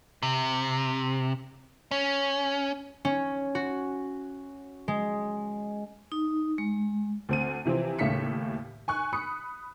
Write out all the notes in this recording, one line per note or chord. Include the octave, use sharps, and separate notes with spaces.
C3
C#4
C#4
F#4
G#3
D#4
G#3
D2 C4 D#7
C3 E3 F3 C4
D#2 A2 C#3 E5 B6 C#7
G#5 C#6 F#6
B5 D#6 C#7